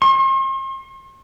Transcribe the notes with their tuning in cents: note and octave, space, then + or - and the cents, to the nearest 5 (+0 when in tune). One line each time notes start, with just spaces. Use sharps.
C6 +45